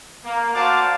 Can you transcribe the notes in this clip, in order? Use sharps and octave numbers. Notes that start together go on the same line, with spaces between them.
A#3
F#4 C5 D5 F5 A5 D6